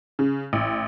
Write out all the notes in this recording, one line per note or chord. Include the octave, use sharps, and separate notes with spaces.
C#3
A1